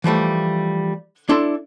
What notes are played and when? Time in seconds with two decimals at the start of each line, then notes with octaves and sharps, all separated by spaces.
0.04 E3 F3 G3 A3
1.29 D4 E4 A4 C6